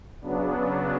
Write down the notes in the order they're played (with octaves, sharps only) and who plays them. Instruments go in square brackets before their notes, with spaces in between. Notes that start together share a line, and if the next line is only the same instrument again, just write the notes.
[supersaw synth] C#3 F#3 B3 D4